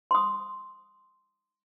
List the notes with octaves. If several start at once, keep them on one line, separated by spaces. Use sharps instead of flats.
C6 D#6